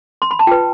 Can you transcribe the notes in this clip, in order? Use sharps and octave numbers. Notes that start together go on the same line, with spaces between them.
C6
B5
A5
F4 B4 G5